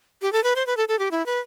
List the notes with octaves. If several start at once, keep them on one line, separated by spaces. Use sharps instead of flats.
G4
A4
B4
C5
B4
A4
A4
G4
E4
B4